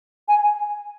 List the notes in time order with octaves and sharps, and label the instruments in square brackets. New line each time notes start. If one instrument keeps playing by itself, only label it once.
[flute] G#5